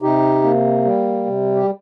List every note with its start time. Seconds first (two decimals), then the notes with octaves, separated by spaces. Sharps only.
0.02 C3 D#4 G4
0.43 A#3
0.85 G3
1.26 C3
1.56 G4